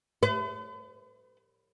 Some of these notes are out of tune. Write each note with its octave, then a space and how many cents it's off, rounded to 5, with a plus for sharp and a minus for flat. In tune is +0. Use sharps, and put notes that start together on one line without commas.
B4 +45